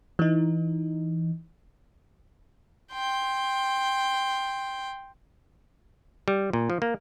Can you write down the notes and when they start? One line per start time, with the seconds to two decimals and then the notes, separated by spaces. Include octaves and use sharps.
0.19 E3 D#4
2.92 G5 C6
6.28 G3
6.53 A#2
6.70 F3
6.82 A#3